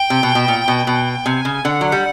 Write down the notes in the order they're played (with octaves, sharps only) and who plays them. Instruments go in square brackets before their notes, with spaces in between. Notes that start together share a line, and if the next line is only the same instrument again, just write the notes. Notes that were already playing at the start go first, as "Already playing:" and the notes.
Already playing: [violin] G5
[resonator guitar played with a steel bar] C3
B2
B2
A#2
B2
[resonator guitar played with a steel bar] B2 [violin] G5
[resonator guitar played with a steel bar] C3 [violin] G#5
[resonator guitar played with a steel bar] C#3
[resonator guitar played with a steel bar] D3 [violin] F#5
[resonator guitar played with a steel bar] F#3
G3